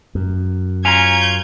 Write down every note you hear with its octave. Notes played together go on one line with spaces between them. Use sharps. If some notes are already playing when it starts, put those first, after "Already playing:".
F#2
C#4 F4 G#5 A#5 G6 G#6